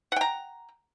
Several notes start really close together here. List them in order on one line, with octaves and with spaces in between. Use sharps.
F#5 G5 A#5